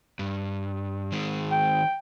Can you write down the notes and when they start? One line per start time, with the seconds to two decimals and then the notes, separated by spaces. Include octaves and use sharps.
0.19 G2
1.12 D#3 G#3
1.52 G5